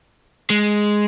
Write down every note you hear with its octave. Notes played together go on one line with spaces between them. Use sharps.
G#3